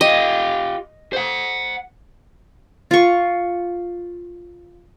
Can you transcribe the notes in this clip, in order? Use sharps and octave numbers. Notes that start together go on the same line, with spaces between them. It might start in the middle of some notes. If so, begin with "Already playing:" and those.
F4 G4 D#5
C5 F#5
F4 C#6